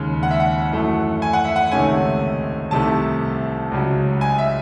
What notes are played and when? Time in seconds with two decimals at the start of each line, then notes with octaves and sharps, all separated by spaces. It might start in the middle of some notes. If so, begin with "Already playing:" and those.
Already playing: D#2 C#3 G#3
0.23 F#5
0.31 E5
0.40 F#5
0.72 F#2 E3 A3
1.22 G#5
1.33 F#5
1.45 E5
1.56 F#5
1.71 C#2 C3 D#3 A3 C#4 G#5
2.71 C2 C3 D#3 A3 A5
3.71 C#2 C#3 F#3
4.21 G#5
4.38 E5